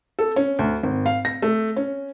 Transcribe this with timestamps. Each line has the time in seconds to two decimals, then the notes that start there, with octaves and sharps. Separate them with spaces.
0.19 A4
0.36 C#4
0.59 D2
0.83 G#1
1.06 F5
1.25 A#6
1.42 A3
1.76 C#4